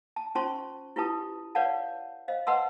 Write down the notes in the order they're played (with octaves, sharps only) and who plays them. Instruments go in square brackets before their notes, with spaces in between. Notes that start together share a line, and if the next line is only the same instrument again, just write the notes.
[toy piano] A5
C#4 F4 C5 A5 C6 C#6
E4 F4 G4 B4 A5 D#6
B4 C#5 D5 F5 F#5 A5
C5 D#5 F5
B4 D#5 F#5 A5 C6 E6